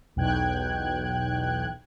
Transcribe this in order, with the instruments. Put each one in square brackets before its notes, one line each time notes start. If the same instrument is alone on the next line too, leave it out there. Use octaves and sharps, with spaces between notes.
[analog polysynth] B1 E2 B2 G5 F#6 G#6